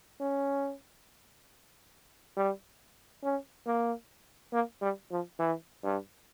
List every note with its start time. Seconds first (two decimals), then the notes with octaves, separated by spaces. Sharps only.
0.21 C#4
2.37 G3
3.23 C#4
3.66 A#3
4.53 A#3
4.82 G3
5.11 F3
5.39 E3
5.83 G2